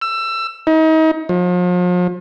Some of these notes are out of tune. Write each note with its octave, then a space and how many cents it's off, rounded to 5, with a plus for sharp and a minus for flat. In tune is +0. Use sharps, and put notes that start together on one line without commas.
E6 +20
D#4 +35
F3 +40